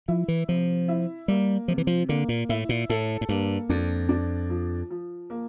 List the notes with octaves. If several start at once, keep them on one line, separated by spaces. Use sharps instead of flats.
F3 E4
E3
C3 F3
E4
G3 A#3
C3 F3
E3
F3
D3 A#3
A#2
A2 E4
A#2
A2 A4
A2
G2 A#3
F2 D4
D4
F3
F3
A#3